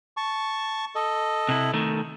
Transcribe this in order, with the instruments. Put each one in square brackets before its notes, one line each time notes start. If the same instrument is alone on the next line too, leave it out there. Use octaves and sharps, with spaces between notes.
[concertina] A5 C#6
A4 D#5
[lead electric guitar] C3 E4
D#3 A3